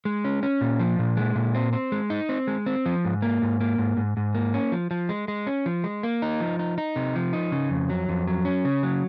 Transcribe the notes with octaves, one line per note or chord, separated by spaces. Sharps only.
G#3
C#4
C#4
A#2
F3
A#2
G#3
A#2
C4
C4
G#3
D#4
C4
G#3
C4
F3
G#2
A#3
G#2
A#3
G#2
G#2
G#2
A#3
C#4
F3
F3
G#3
G#3
C#4
F3
G#3
A#3
D#4
F3
D#4
D#4
C3
F3
D#4
C#3
F2
F#3
F2
F#3
C#4
C#3
F#3